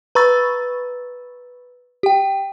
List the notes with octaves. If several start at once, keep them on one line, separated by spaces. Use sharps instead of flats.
B4 A#5 B5 C#6 E6 A6
G4 G5